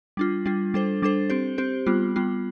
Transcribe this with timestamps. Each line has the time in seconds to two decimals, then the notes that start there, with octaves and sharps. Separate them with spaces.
0.17 G3 D4 F4
0.46 G3 D4 F4
0.74 G3 D4 A4 C5
1.02 G3 D4 A4 C5
1.30 C4 G4 C5
1.58 C4 G4 C5
1.86 G3 B3 F4
2.16 G3 B3 F4